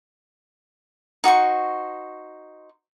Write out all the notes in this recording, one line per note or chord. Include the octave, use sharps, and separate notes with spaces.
D#4 F#4 C5 C#6